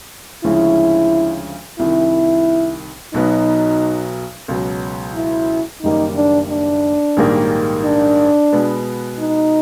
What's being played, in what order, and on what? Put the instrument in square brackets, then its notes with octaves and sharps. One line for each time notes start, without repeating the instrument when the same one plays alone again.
[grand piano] D2 C#3 F3 G#3 C#4 [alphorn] E4
[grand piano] C2 C3 D#3 [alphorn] E4
[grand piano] B1 B2 F#3 B3 [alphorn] D#4
[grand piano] C#2 B2 F#3
[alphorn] E4
[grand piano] F#1 F#2 D#3 G3 A#3 [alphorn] D#4
[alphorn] D4
D4
[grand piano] A#1 G#2 D#3 G3 A#3
[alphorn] D4
[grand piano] B2 G#3 B3
[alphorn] D#4